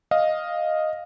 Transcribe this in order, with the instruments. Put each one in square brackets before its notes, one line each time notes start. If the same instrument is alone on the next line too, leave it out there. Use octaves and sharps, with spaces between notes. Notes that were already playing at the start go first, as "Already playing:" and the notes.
[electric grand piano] D#5 F5